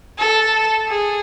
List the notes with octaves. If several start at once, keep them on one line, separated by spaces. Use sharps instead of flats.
A4
G#4